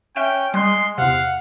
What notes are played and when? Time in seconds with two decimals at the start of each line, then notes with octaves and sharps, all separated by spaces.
0.16 C#4 E5 G5 F#6 D7
0.54 G3 G#3 C6 F#6
0.98 E2 C3 F5 F#5